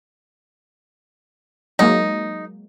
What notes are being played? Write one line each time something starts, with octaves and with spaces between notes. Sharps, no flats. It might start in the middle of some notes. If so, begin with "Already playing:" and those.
F#3 G#3 A#3 D#4